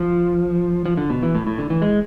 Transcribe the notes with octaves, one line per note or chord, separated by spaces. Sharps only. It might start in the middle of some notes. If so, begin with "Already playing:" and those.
Already playing: F3
F3
D3
B2
E3
A2
A2
D3
E3
G#3